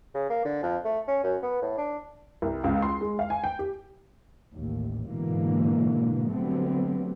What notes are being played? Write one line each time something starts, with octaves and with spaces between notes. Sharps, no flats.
C#3
A#3
D3
F2
A3
C#4
F#2
B3
A2
D4
C2
C#2
C6
G#3
F5
G#5
G5
G4
A1 D#2
G#2 B2 D3 E3 A#3
D3 F#3 G3 A3 B3 C4